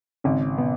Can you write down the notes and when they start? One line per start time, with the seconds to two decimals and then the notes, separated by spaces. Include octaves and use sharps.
0.24 G#1 C#3 C#4
0.58 B2 B3